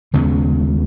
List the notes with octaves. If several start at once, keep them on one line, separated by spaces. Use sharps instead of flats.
D#2 C#3 G#3 B3